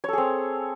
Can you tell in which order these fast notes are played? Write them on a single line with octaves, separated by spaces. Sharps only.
C#5 A4 G#4 C4